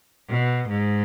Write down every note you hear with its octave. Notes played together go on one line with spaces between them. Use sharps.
B2
G#2